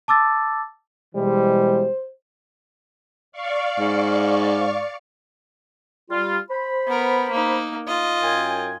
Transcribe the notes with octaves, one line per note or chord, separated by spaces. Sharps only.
A5 D6 E6 A6
B2 E3 G3 G#3 C5
D5 F5 C#6
G#2
G3 F4
C5 B5
B3 A#4
A#3 D#4
F4 D#5
F#2 G5 G#5